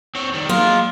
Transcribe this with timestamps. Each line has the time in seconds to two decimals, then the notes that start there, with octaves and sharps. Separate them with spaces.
0.15 C4 C#5
0.33 D#3 G3
0.49 F#3 G#3 A#3 F4 A#4